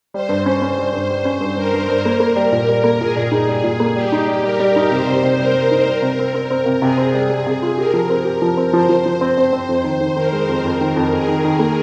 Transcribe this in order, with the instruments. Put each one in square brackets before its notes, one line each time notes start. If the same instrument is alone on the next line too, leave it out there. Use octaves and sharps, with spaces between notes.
[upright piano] G3 [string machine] C5
[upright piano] G2
C#4
[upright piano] C#4 [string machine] C5
[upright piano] G3
G2
[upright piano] G3 [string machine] C5
[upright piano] C#4
G2
[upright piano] G2 [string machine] A#4
[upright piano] G2
G2
A#3
A#3
G3
A#2
G3
A#3
[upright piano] A#2 [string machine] G#4
[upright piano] A#2
D#4
G3
A#2
A#3
[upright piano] G3 [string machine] G4
[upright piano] D#4
G3
[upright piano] G3 [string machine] A#4
[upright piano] G3
D#4
[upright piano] C3 [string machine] C5
[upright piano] C3
C3
[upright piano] G3 [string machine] A#4
[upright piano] G3
D#4
G3
C3
C4
C4
C4
C3
[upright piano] C3 [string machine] G#4
[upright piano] C4
G3
G3
C3
F4
[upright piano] G4 [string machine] A#4
[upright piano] F3
C4
G4
F3
C4
[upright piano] F3 [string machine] C5
[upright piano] F3
F3
[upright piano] C4 [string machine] C5
[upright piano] C4
C4
F2
D#3
D#3
[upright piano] D#3 [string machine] A#4
[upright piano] G#3
F2
[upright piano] F2 [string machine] A#4
[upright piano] D#3
F2
[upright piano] F2 [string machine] G#4
[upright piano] D#3
D#3
A#3